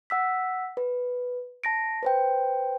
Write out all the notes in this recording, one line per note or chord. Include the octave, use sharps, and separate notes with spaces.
F#5 E6 B6
B4
A5 A#6 D7
B4 C5 G5